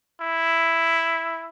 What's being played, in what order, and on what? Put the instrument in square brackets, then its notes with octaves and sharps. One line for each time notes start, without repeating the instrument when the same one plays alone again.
[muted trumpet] E4